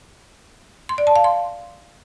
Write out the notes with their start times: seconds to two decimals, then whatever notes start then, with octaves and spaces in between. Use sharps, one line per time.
0.89 C6
0.98 D5
1.07 A5
1.16 F5
1.24 C6